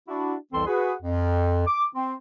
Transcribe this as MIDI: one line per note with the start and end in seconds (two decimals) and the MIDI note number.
0.08 0.35 62
0.08 0.35 64
0.08 0.35 66
0.53 0.65 36
0.53 0.65 41
0.53 0.65 52
0.53 0.65 60
0.53 0.65 69
0.53 0.65 84
0.67 0.93 66
0.67 0.93 68
0.67 0.93 71
1.01 1.65 41
1.67 1.84 86
1.94 2.14 60